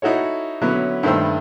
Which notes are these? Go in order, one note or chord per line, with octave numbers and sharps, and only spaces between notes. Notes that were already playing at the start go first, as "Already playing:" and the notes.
D#4 E4 F#4 A4 C#5
D3 F#3 B3 C#4 E4
G2 D#3 A3 E4 C5 E6